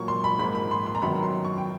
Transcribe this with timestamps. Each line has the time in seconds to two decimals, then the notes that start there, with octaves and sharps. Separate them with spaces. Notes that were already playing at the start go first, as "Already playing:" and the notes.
Already playing: A#2 F#3 A#3 C#6
0.08 C6
0.24 B5
0.39 G#2 F3 A#3 B5
0.55 B5
0.71 C6
0.86 C6
0.95 A#5
1.02 F#2 D#3 F#3 B3 B5
1.23 C6
1.45 C#6
1.58 G5